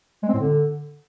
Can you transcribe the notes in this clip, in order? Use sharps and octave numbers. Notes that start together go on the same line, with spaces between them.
G#3
C4
A2
D3